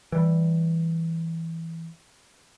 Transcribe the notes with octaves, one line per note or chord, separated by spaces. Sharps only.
E3 G3